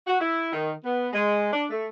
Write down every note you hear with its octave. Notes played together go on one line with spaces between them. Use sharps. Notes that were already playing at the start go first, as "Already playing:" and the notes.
F#4
E4
D#3
B3
G#3
D4
A3